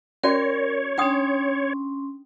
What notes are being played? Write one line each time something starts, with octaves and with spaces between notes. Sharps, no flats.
C#4 F#4 A#4 C#5 D5
C#4 D4 G5 C6 D#6